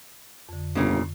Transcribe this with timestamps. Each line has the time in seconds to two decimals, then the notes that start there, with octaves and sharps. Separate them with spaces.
0.49 F2 D3
0.75 G1 A#2 C#3